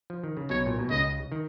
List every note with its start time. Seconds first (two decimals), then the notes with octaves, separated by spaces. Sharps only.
0.10 F3
0.24 D#3
0.37 C#3
0.50 B1 B2 C#5
0.66 A#2
0.79 B2
0.90 C#2 C#3 D#5
1.32 D#3